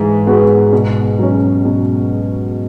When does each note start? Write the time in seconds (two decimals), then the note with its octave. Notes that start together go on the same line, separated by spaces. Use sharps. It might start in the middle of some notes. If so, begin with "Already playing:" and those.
Already playing: G#2 E3 G#3
0.26 G#3 B3 F#4
0.73 B2
1.19 F#3 C#4
1.65 B2